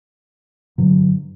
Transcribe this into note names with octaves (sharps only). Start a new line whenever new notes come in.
G2 D3 F#3